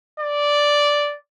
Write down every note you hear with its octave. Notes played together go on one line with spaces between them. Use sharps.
D5